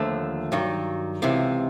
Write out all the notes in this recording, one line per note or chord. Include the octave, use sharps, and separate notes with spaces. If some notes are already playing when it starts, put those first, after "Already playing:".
Already playing: D#2 D3 F3 A3
G2 D#3 F#3
C#2 C3 E3